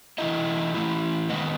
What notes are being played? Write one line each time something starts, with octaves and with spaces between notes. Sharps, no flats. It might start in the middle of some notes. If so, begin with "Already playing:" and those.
E3 A3 E4 D#5
E3 A3 E4
D#3 G#3 B3 D#5